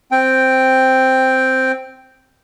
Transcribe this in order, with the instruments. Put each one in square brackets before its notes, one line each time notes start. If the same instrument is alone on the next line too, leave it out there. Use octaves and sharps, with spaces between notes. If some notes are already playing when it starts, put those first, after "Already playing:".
[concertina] C4 G5